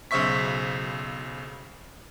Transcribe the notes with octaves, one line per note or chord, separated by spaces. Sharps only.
B1 C#3 C5 E5 C#6 B6